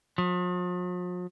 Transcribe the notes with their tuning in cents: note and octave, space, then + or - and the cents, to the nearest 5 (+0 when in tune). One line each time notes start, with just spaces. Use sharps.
F3 +45